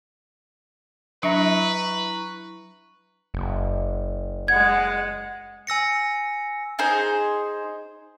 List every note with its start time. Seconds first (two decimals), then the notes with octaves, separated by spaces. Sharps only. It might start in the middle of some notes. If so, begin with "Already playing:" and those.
1.23 F#3 D4 E4 B4 E5 A#5 C#6
3.34 F#1
4.48 G#3 F#5 G#6
5.67 G#5 E6 A#6 C#7
6.79 D#4 G#4 C5